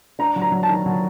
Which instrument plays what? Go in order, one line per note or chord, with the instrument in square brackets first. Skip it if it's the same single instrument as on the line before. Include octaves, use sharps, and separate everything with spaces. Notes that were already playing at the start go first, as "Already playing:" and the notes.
[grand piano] D4 [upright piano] A#5
[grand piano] F#3
[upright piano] A#5
[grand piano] F#3
[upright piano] A5
[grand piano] D#3
F#3